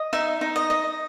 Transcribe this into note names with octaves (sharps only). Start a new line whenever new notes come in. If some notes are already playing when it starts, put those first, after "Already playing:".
Already playing: D#5
D#4 E5
D#4
D#5
D#5